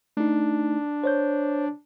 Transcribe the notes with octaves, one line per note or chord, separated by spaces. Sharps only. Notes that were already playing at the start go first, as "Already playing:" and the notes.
A3 D4 D#4
C5 C#5 G6